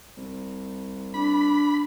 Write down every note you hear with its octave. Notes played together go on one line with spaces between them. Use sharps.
C2
D4 B5